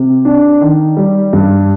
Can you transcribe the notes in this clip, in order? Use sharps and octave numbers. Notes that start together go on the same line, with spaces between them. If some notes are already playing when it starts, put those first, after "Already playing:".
Already playing: C3
D4
D#3
G3
G2